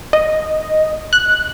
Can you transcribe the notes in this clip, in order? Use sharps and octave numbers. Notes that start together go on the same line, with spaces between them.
D#5
F#6